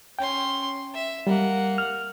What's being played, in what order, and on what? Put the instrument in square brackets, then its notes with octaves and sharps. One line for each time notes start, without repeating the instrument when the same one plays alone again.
[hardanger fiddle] C#4 C6 [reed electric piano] G5
[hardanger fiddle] E5
[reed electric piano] G3 [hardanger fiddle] A#3 F#5
[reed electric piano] F6